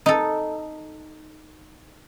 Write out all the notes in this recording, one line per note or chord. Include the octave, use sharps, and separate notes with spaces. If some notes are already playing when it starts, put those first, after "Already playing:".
D#4 A4